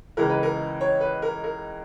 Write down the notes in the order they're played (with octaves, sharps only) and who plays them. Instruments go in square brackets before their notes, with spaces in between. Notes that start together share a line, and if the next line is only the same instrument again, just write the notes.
[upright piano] C#2 C#3 E3 G#3 A#4
B4
A#4
C#5
B4
A#4
A#4